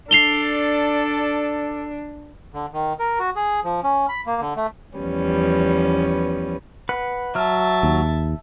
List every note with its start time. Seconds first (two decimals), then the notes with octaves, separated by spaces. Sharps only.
0.11 D4 A4 D5 C7 F7 G7
2.54 D3
2.73 D#3
2.99 A#4
3.19 F#4
3.36 G#4
3.64 F3
3.83 C#4
4.09 B5
4.26 A#3
4.41 D3
4.56 A3
4.97 E2 F3 G3 B3 C#4
6.89 B4 F#5
7.35 F#3 E5 A5 F6
7.83 D#2